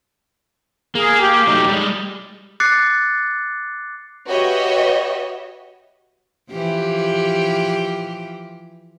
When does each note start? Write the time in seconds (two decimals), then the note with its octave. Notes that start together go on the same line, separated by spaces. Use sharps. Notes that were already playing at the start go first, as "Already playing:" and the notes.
0.95 A#3 G#4
1.22 G4
1.47 F#3 A3 D#4
1.68 G3 G#3
2.60 D6 F#6 A6 C7 C#7
4.28 F#4 G4 B4 C#5 D#5 E5
6.51 E3 F3 G4